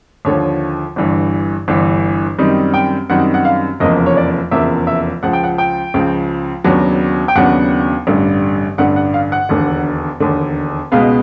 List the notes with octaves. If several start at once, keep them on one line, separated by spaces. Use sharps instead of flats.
D#2 D3 F3 C#5
G1 G2 E3
G1 G2 E3
F#2 D#3 G3 C4 D#4
G5
F#2 D#3 G3 C4 D#4 F#5
F#5
F5
F1 E2 C#3 F3 A#3 D#5
C#5
D5
F1 E2 C#3 F3 A#3 E5
E5
C#2 C#3 F3 F#5
G5
F#5
G5
C#2 C#3 F3
D#2 C#3 F#3 B3 D4
G5
D#2 C#3 F#3 B3 D4 F#5
A1 G2 D3 G3
A1 G2 D3 G3 F#5
F#5
F5
F#5
E1 D#2 D3
E1 D#2 D3
C#2 B2 G#3 B3 F5